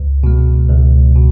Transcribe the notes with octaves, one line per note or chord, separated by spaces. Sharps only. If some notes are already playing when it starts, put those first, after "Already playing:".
Already playing: C#2
B2 G#3
C#2
B2